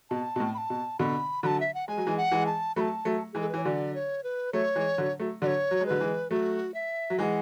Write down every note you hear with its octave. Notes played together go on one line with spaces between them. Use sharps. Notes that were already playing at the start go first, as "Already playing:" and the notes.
B2 A5
B2
A2
B5
A5
B2
B2 D3 B5
D3 F#3 A5 B5
E5
F#5
G#3 G#5
F#3
E3 G#3
F#5
E3 G#3
A5
F#3 A3 B5
A5
F#3 A3
E3 G#3 G#4
A4
B4
E3 C#5
D3 F#3 D5
C#5
B4
F#3 A3 C#5
E3 G#3
D3 F#3
F#3 A3
D3 F#3 D5
C#5
F#3
G#3
D3 F#3 B4
E3 G#3
F#3 A3 F#4
E5
F#3
E3 G#3 F#5 G#5